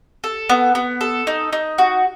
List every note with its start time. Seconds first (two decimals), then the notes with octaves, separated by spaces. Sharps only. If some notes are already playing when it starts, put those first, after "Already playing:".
0.24 A4
0.49 B3
0.75 B3
1.01 A4
1.27 D#4
1.53 D#4
1.78 F#4